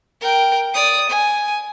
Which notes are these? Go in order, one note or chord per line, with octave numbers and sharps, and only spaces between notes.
A#4 G5
D5 D#6
G#5